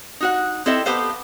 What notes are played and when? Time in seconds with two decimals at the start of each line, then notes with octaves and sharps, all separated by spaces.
0.21 D#4 F#4 F#5
0.66 C4 E4 A4 D#5 E5 G5
0.86 B3 G4 A4 C5 F5